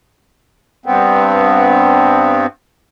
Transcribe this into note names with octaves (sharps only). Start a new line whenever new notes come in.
G2 B3 C4